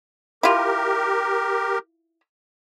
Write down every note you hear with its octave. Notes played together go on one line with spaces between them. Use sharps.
E4 F4 G4 A#4